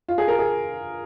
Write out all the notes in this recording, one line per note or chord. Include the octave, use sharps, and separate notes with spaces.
F4
G#4
A#4
G#4